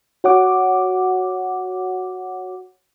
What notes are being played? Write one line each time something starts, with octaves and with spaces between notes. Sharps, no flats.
F#4 C#5 F#5 D6